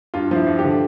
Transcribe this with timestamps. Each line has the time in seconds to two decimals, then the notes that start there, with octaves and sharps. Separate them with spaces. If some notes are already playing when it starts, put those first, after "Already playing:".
0.14 G2 F4
0.31 F3 E4
0.47 G2
0.59 G4
0.64 D3